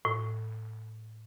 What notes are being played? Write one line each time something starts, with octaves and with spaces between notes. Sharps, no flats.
A2